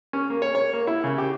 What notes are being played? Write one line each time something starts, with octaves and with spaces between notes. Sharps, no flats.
C#4
A#3
C#5
C#5
A#3
E4
C#3
G4